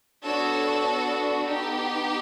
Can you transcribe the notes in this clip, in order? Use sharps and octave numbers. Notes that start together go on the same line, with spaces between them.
B3 D4 F#4 A4 C#5
B3 D#4 G4